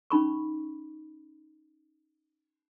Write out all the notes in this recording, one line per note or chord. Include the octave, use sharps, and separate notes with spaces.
C#4 D#4 B5 C#6